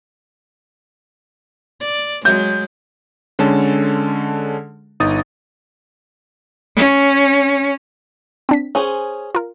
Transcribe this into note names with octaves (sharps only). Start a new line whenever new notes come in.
D5
F#3 G#3 G6
D3 G#3 C#4 A4 A5
G1 D#4 D#6 A6
C#4
C4 D4 B6
C#4 G#4 C5
F4 A#4